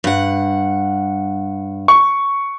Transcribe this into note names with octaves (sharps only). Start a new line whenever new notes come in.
G2 F#5
C#6